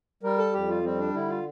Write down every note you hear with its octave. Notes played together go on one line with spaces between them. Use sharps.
G3 A#4
A4
F2 G4
F4
G3 C4
D4
D3 E4
F4